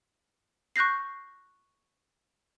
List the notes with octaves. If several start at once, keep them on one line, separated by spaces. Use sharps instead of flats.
C#6 F#6 G6 A#6 C7